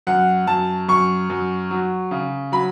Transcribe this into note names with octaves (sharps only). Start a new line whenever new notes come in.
F#2 F#5
F#2 A5
F#2 C#6
F#2
F#3
C#3
F#3 B5